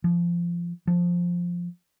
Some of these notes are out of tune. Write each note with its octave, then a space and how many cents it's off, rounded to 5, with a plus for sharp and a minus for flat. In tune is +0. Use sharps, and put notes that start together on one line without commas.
F3 -20
F3 +5